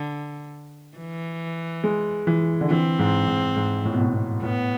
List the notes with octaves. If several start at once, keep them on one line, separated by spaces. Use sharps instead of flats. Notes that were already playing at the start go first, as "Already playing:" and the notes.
Already playing: D3
E3
G#3
E3
D3
E3 C4
G#2
G#2
G#2
A2
B2
A2
B2
A2 B3